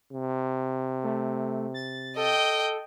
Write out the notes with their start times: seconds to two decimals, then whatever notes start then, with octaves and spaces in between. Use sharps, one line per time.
0.12 C3
1.03 A3
1.74 A6
2.17 A4 D#5 G5